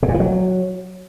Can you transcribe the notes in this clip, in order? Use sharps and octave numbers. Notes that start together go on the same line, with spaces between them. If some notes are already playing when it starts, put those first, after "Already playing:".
C3
A#2
E3
F#3